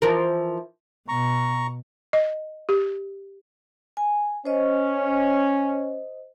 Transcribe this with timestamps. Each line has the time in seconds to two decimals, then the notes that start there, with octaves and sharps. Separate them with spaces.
0.02 E3 F3 A#4
1.08 B2 A#5 C#6
2.13 D#5
2.69 G4
3.97 G#5
4.45 C#4 C5 D#5